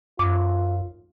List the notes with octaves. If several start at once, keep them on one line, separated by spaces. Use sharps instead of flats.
F#2 F4 D6